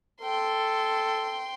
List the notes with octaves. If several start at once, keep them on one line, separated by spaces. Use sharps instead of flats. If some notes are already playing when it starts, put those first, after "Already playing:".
A4 G5 C6